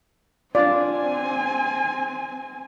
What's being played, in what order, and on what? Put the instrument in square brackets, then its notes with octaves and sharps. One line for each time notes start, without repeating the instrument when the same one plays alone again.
[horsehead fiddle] C4 G#5 [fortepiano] D4 F4 [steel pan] D5